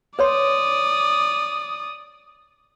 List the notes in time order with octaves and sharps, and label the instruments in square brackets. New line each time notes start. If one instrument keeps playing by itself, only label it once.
[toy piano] B4 C#5 C6 [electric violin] D5 D#6